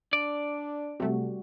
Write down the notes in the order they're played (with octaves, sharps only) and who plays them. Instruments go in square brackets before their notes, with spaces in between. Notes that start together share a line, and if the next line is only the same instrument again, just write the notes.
[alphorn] D4 [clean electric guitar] D5
[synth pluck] C3 A3 [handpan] G3 F#4